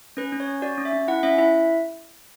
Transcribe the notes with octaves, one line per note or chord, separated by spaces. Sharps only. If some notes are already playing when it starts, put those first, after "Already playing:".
C#4 B4
C#4
C#5
C#4
F#4 D5
C#4
E5
C#4
E4 F#5
C#4 E5
E4 E5